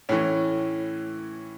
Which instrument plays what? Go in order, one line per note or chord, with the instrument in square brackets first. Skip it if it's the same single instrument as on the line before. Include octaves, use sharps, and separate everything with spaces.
[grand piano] A2 E3 C#4